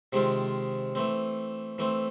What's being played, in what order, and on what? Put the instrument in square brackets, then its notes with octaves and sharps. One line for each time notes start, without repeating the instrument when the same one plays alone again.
[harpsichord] C3 D#3 G#3 C4 F4
E3 A3 C4
E3 A3 C4